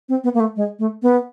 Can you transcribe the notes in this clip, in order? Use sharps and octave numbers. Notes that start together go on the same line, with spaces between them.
C4
B3
A#3
A3
G#3
A3
B3